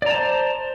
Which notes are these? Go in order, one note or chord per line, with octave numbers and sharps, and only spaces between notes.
C5 D5 A5 A#5